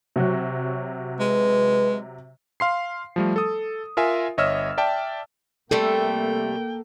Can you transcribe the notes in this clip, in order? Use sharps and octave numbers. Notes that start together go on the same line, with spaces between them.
C3 F#3 F#4
G#3 B4
F5 C6 C7
F3 G3 A3
A4 D#6
F4 A#4 E5 G#5
G1 C#5 D#5 E5 E6 F6
D5 E5 G5 A5
C3 G3 A3 A#3 A4 G5